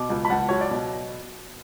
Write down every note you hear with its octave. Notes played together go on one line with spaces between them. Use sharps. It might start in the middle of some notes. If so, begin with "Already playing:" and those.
Already playing: B2 D6
C#2
B5
C#2 F#5 A5
F#3 C#5
D5
B2